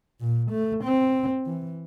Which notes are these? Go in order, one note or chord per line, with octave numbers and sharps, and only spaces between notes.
A#2
A3
C4
E3